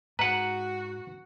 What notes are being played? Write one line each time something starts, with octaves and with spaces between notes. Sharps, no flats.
G#2 F#4 B4 F#5 A#5